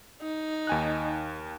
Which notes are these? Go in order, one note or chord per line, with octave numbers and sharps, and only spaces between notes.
D#4
D#2 G#5 F#6